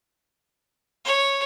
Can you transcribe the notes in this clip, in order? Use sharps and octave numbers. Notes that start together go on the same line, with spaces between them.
C#5